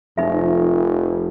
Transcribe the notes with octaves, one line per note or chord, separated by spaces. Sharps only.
F1 F2 D#4 E5